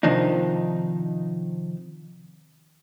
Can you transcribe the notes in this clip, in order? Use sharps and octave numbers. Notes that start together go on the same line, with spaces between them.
C3 D#3 F3 D4 D#4